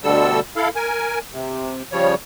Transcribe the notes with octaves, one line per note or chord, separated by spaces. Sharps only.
D2 B2 D3 G3 A4 E6
E4 A4 F5
A#4 G#5
C3
C#3 F3 G3 C#5